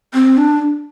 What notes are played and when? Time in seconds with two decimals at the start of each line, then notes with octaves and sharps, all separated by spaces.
0.14 C4
0.37 D4